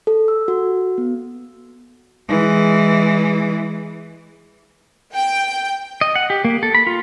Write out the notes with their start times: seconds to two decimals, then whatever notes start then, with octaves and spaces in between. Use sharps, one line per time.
0.07 A4
0.28 E6
0.48 F#4
0.98 B3
2.28 E3 G#3
5.13 G5
6.01 D#5
6.15 F#5
6.30 G4
6.45 A#3
6.63 A4
6.75 B5
6.87 F4